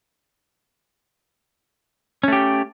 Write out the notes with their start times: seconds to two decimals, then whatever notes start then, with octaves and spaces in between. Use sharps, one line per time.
2.23 C#4
2.28 A3
2.33 G4